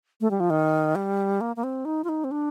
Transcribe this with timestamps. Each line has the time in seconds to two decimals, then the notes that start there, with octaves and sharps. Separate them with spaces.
0.21 A3
0.31 G3
0.40 F3
0.50 D#3
0.95 G3
1.41 A#3
1.56 A#3
1.64 C4
1.85 D#4
2.04 F4
2.09 D#4
2.24 C4
2.31 D4